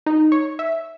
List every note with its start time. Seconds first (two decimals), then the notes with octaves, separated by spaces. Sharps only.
0.06 D#4
0.32 C#5
0.59 E5